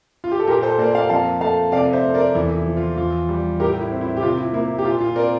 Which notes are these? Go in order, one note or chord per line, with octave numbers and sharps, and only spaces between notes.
F4
G4
A4
A#2 G4 A#4
A4 C5
A#3 A#4 D5
D5 F5
F2 F5 A5
A3 F5 A5
C3 D5 F5
C5 E5
A3
A#4 D5
E2 E4
E4
F3
F4
E2 F4
G3
A2 G4 A#4
E4
C4
E4
G4
C3 F4
E4
A#3 E4
G4
A#2 F4
F4
C4 A#4 D5